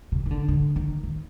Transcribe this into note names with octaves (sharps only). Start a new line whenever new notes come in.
C3
D#3
D3
D3
D#3
D#3